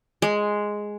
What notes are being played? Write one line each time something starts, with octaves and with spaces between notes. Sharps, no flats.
G#3